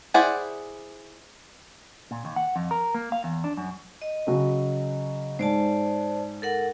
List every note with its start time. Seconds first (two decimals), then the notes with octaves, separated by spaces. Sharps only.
0.14 E4 G#4 C5 D5 F#5
2.11 A#2
2.25 D#2
2.36 F#5
2.56 F2
2.71 A#4
2.94 A#3
3.12 F5
3.24 E2
3.44 D4
3.57 F#2
4.02 D#5
4.27 C#3 F#3
5.39 G#2 C5 D5 A5
6.42 A4 A#4 F#5